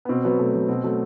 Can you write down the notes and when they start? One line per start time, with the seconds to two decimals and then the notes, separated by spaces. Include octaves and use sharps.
0.05 B3
0.09 B2 C4
0.24 F#3 B3
0.39 B2 A3
0.54 F#3
0.68 B2 C4
0.84 F#3 A3